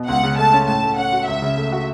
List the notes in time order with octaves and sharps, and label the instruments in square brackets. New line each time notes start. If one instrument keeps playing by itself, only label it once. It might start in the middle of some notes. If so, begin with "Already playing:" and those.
Already playing: [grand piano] B2
[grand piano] C#2 [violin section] F#5
[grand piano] C#3
[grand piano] A3 [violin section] A5
[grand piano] C#4
[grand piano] A2 [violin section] A5
[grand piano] A3
[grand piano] C#4 [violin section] F#5
[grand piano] F#4
[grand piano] C#2 [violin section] E5
[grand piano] C#3
A3
F#4